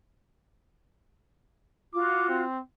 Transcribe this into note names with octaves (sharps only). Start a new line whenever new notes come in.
F4 F#4 D6
C4